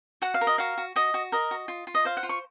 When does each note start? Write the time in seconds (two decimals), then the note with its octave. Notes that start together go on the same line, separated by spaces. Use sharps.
0.22 F#4 F#5
0.34 F5
0.41 A#4
0.47 D#5
0.58 F#4 F5
0.78 F#4
0.96 F#4 D#5
1.14 F#4
1.32 A#4 D#5
1.51 F#4
1.68 F4
1.87 F4
1.95 D#5
2.05 C5 F5
2.17 F#5
2.23 F4
2.29 C#6